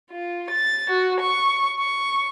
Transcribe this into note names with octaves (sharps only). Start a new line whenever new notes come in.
F4
A6
F#4
C#6
C#6